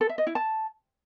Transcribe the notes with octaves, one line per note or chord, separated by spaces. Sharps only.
A4
E5
D#5
E4
A5